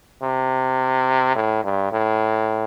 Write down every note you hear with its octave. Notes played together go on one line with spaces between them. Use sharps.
C3
A2
G2
A2